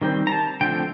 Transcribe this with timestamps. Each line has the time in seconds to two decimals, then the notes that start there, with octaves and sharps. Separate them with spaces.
0.01 D#3 G3 C4
0.27 A#5
0.32 A5
0.61 D3 F3 A3 C4 G5